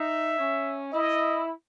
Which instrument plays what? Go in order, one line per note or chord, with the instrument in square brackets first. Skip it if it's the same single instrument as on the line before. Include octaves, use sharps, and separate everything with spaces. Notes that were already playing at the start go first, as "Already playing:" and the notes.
Already playing: [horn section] D#4 [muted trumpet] E5
[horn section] C#4
[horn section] E4 [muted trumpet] D#5